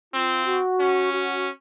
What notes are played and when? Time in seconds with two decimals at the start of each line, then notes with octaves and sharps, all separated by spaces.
0.14 C4 F4
0.46 F#4
0.80 C#4
1.13 F#4